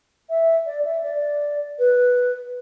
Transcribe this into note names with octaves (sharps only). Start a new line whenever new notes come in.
E5
D5
E5
D5
B4